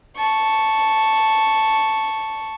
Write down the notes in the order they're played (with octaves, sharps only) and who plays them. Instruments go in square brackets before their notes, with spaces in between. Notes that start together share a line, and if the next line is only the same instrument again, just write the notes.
[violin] A5 C#6